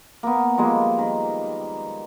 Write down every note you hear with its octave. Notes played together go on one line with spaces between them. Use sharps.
A#3 B3
F3 G3 G#3 A#3
D#3